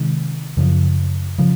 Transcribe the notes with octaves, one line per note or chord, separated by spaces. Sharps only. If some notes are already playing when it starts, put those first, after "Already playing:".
Already playing: C3 D#3 G#3
F#2 C#3 F3
C#3 F3